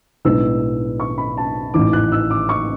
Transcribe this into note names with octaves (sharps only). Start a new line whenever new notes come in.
B1 A2 G#3 B3 D4 E6
C#6
B5
A5
A1 G#2 E3 D6
F#6
E6
D6
C#6